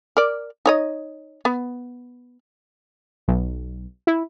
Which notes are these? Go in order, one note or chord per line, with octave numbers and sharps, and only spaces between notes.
A#4 D5
D#4 C#5 D#5
B3
B1
E4